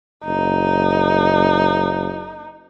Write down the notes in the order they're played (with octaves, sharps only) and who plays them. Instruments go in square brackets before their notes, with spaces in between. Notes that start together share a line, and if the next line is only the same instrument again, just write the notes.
[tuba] F#1 [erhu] D#4